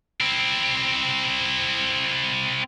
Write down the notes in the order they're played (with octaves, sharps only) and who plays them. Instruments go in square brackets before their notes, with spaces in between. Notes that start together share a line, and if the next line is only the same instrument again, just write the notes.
[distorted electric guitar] C4 E4